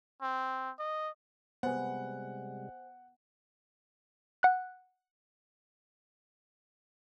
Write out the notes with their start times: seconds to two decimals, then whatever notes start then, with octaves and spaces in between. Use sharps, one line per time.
0.22 C4
0.79 D#5
1.63 C3 G3 G#3 B3 C5 F#5 G#5
4.43 F#5 F#6